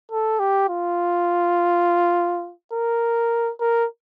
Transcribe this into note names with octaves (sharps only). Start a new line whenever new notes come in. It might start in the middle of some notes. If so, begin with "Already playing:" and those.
A4
G4
F4
A#4
A#4